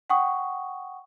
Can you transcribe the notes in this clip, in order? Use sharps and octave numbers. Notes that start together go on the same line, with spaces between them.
F#5 G5 C#6 D#6